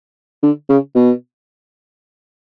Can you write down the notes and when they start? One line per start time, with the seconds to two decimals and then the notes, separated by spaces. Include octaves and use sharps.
0.43 D3
0.69 C#3
0.95 B2